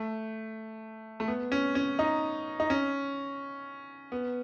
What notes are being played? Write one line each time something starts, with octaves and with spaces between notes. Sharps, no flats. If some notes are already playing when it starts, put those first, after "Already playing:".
Already playing: A3
A3
B3
C#4
C#4
D#4
D#4
C#4
B3